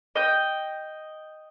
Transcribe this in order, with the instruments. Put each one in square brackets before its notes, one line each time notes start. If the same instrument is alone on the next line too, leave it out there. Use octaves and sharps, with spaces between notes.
[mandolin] D#5 G5